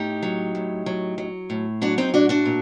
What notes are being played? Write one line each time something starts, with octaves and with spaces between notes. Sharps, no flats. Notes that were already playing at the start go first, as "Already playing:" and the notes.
Already playing: A2 D#4 G4
F#3
A2
F#3
F#3
A2
F#3 D4 F#4
C4 D#4
A2 D4 F#4
D4 F#4
A#2